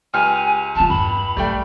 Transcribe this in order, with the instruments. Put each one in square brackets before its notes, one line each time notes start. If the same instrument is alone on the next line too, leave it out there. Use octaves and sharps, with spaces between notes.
[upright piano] C#2 G4 F6 [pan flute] G#5
[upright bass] F1 F4 [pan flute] A5
[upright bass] E2 G2 [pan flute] B5
[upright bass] A#1 [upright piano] G3 A3 G5